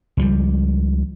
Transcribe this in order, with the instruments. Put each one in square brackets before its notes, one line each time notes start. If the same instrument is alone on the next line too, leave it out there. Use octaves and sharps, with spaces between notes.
[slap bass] C#2 F3 G3